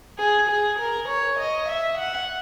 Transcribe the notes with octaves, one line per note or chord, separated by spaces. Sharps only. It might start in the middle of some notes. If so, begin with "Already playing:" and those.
G#4
G#4
A#4
C#5
D#5
E5
F#5